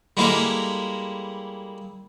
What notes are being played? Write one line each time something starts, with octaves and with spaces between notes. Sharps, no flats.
G3 G#3 A#3 E4 A4 A#4